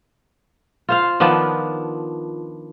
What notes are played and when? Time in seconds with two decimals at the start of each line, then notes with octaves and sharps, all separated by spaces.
0.89 F4 C5 F5
1.20 D#3 F3 B3 D4